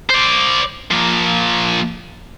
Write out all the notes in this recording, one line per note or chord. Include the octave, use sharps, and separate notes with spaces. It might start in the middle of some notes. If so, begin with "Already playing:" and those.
C5 D5
F3 A#3